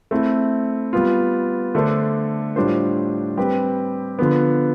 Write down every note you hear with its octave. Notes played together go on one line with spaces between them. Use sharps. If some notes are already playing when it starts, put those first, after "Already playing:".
A3 C4 E4
G3 B3 F4
D3 A3 D4 A4 C5
A2 G3 D4 F4 C5
G3 C4 G4 B4
D3 F3 B3